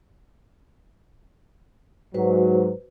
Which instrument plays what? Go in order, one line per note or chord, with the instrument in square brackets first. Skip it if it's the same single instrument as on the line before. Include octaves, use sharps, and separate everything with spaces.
[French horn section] G#2 F#3 [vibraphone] F#4 B4 C5